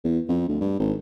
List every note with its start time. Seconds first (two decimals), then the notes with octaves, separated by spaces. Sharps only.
0.04 E2
0.28 F2
0.48 D2
0.61 G2
0.79 G#1